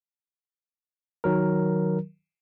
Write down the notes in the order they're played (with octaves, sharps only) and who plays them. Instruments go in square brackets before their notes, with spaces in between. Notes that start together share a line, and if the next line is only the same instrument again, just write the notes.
[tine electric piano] D#3 F#3 A#4